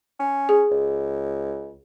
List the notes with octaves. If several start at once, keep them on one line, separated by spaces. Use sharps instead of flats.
C#4
G#4
C#2